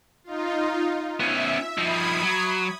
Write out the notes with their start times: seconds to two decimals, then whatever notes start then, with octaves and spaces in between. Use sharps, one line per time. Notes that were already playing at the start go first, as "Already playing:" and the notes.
0.24 D#4 F4
1.20 B3 C#4 E5
1.78 F3 D#4 B5 D#6 G#6
2.23 F#3